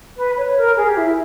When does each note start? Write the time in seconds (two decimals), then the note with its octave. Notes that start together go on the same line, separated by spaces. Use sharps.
0.17 B4
0.37 C#5
0.57 A#4
0.76 G#4
0.88 G4
0.97 E4